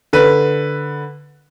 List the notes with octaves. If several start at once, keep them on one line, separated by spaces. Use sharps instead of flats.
D3 B4